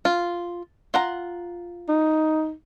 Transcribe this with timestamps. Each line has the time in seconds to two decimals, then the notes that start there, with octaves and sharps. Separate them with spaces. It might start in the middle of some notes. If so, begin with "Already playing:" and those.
0.05 F4
0.94 F4 F#5 A#5
1.89 D#4